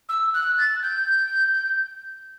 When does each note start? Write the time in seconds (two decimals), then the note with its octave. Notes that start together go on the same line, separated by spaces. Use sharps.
0.09 E6
0.34 F#6
0.58 A6
0.83 G6